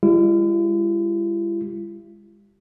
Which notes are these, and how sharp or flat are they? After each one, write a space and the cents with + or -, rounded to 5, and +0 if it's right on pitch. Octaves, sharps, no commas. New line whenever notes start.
G#3 -40 E4 +45 G4 -25